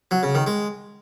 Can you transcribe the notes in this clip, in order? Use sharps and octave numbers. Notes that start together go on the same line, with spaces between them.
F#3
C#3
D#3
G#3